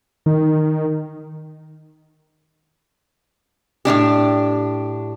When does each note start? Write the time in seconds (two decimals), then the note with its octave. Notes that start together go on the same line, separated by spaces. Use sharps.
0.26 D#3
3.85 A2 C#3 D4 G4